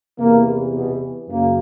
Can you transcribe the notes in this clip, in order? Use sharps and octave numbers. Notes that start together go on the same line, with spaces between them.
E2 C3 E3 A#3
B2 B3
F#2 C#3 A#3